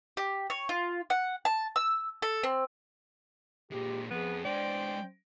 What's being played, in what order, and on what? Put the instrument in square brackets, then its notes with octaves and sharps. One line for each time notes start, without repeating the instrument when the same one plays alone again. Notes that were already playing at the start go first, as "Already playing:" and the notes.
[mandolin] G4
C#5
F4
F#5
A5
E6
A4
C4
[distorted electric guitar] A#2 G#3 [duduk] G4
[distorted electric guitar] F2 [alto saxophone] B3 [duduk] G#4
[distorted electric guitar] G#3 D4 [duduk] C5 [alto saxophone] D5 [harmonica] G5